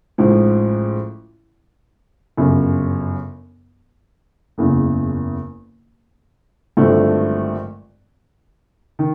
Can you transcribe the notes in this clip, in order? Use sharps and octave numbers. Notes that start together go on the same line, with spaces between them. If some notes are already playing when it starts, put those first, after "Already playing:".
A1 G#2 F3
G1 F#2 C#3
F#1 E2 C#3
G#1 G2 D3 F3 A3
D#3